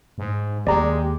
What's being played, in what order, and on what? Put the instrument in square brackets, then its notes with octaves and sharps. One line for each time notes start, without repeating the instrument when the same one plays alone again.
[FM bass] G#2
[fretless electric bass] D#2 [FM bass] G#3 [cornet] G4 [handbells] D5 A#5